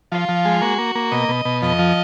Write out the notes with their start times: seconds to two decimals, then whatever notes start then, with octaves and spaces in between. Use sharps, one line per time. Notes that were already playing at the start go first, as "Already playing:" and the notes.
0.12 F3 F4
0.29 F3
0.45 G#3
0.62 A#3 F#4
0.78 A#3
0.95 A#3
1.11 B2 D#5
1.29 B2
1.45 B2
1.62 F2 D#5
1.79 F3